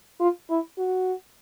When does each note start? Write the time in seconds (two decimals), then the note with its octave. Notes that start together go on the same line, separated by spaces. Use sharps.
0.20 F4
0.49 E4
0.78 F#4